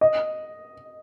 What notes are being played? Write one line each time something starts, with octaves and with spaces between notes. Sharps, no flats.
D#5